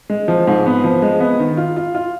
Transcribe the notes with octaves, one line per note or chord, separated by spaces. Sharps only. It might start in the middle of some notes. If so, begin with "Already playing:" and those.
G#3
F3
G#2
B3
F3
G#3
B3
D#3
F4
F4
F4